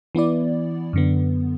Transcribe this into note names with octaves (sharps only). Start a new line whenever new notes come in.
E3 B3 E4 D5
F#2 D3 B3